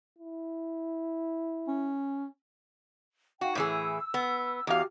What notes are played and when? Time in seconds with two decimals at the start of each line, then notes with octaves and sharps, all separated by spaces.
0.19 E4
1.68 C#4
3.41 D#4 F#4 F5 G5
3.55 A2 E3 G#4 E6
4.14 B3
4.67 E2 F#4 G4 F5 D6